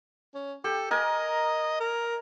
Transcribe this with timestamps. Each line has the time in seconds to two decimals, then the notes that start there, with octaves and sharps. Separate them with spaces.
0.35 C#4
0.64 G4 A4
0.91 A#4 D#5 G#5
1.80 A#4